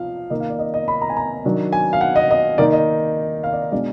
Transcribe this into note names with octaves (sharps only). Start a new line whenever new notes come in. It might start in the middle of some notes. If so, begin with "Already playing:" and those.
Already playing: F3 F5
D#3 A#3 D#4 D#5
F5
D5
D#5
D#5
B5
A#5
G#5
A#5
D#3 F#3 D4
G#5
F5
F#5
D#5
D#5
D#3 A#3 D#4 D5
D#5
F5
D5
B2 G#3 D4 D5